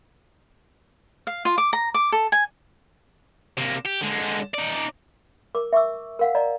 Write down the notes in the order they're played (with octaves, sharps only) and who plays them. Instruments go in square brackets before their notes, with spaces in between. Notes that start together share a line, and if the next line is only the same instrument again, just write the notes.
[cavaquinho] F5
F4
D6
A#5
D6
A4
G#5
[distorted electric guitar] C3 A#3
G4
D3 G#3
D#4 D5
[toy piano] A#4 D6
E5 C#6 D6 E6
A#4 F5 F#5
D5 D#5 A#5